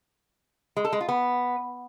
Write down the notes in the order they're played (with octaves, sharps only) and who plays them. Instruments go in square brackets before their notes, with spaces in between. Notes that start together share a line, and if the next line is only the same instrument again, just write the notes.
[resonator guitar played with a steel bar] G#3
A4
G#3
F4
B3